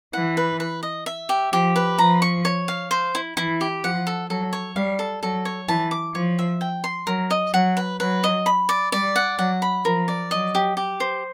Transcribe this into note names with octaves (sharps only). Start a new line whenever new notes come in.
E3 F#5
B4
B4
D#5
E5
G4
F3 G4
B4
F3 A#5
C#6
C#5
F5
C5
E4
E3 E4
G4
F3 F#5
A4
F#3 A4
C#5
G3 F5
A4
F#3 A4
C#5
E3 A5
D6
F3 C#5
E5
G5
C6
F#3 A#4
D#5
F#3 F#5
B4
F#3 B4
D#5
B5
D5
G3 D5
F#5
F#3 F#5
B5
F3 A#4
D5
F#3 D#5
G4
G4
C5